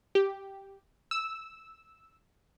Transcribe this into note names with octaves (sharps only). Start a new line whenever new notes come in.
G4
E6